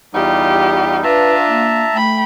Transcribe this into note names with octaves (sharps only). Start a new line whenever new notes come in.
E2 G3 D#4 F4 G4
D4 F4 B4 E5 A5 A#5
A#3
A3 G5 B5